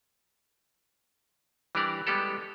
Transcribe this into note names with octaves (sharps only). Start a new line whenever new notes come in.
E3 G3 D4 G4 A#4 D5
G3 G#3 B3 G4 A4